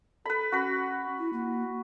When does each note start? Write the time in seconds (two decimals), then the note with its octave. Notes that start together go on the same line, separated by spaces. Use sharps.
0.25 A4 B4 B5
0.52 C#4 F#4 B4
1.19 E4
1.33 A#3